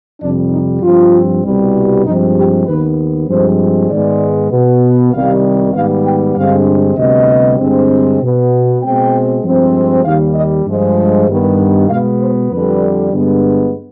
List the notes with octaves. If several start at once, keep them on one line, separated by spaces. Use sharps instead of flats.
F2 C3 G3 D4
D#4
G2 F3 C4 F4
C2 B2 G3
G2 F3 G#3 C4 D#4
G4
D#2 D#3 B3 B4
G2 F3 G#3 C4 C5
G#2 D#3 G#3 B3 D5
B2 B3
C2 C3 D#3 G3 F5
G#2 D#3 G3 B3 F5
G5
G2 D3 G#3 C4 F5
D2 C3 G3 B3 D#5
G2 D3 G#3 C4
B2 B3
B2 G#3 C4 G5
G2 F3 G#3 C4
D#2 D#3 G3 F5
D#5
G2 F3 G#3
G2 D#3 B3
B2 G#3 B3 F5
C5
F2 D3 G3 B4
G2 D3 G#3 B3